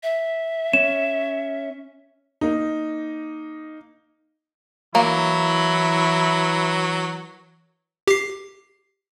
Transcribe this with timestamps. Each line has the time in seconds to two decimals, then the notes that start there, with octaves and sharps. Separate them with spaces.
0.03 E5
0.73 C#4 E7
2.41 A#3 D#4
4.95 E3 F#3 A#3 E4
8.07 G4 C7